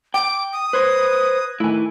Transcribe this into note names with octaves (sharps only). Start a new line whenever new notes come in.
G5 D6
D#6
B4 C5 F#6 G#6 A#6
D#3 A3 E4 G#5